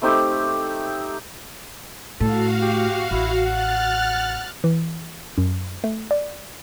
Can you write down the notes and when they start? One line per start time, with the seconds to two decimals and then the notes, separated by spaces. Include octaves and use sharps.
0.02 A3 C4 D#4 G4
2.20 A2 F#4 A4 F5
2.62 G4
3.11 A1 E4
3.45 F#5 F6 F#6 A6
4.64 E3
5.38 F#2
5.84 A3
6.11 D5